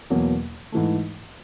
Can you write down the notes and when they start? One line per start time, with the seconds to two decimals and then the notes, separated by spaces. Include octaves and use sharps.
0.10 E2 B2 F#3 A#3
0.72 G#2 E3 A3